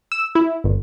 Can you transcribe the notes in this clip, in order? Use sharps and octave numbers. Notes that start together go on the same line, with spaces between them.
E6
E4
G1